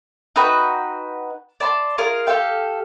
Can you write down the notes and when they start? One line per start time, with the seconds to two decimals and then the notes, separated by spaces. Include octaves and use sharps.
0.36 D#4 F#4 B4 G5
1.60 D5 A5 B5 C6
1.98 F4 G#4 A#4 F5
2.27 G4 A4 F5 G5